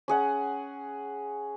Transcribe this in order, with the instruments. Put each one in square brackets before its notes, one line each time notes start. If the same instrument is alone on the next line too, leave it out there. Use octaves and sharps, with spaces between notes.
[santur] C#4 G#4 F#5